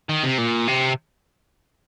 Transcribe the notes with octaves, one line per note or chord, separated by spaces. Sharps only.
D#3
C3
A#2
C3